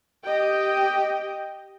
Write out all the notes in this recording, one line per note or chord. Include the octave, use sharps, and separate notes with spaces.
G4 D#5 G5